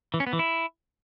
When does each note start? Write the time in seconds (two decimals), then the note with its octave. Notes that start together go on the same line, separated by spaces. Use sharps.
0.14 E3
0.20 C#4
0.27 B3
0.33 E3
0.39 E4